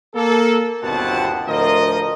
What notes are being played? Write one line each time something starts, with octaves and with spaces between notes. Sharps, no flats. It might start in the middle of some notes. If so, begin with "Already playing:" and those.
A#3 A4
G1 D#2 B2 C4 F#5 A5
D2 A2 F3 A#4 D#5